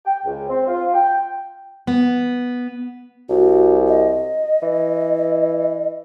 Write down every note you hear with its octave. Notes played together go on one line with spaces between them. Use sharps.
G5
C#2
C4
F4
G5
B3
C2 F#4
D#5
E3